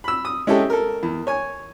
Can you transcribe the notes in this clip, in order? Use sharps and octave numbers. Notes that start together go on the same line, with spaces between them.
B5 E6
D#6
G#3 C#4 E4 G4 A4
A4 A#4
E2
C#5 G#5